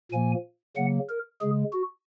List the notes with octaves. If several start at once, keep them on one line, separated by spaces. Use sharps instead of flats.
A#2 F3 A#3 G#5
C#3 F#3 A#3 F#5
A#4
C#3 G#3 G#4
F#4